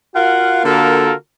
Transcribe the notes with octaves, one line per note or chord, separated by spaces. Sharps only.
F4 F#4 A#4 F5 F#5
D3 A#3 F4 F#4 A4 A#4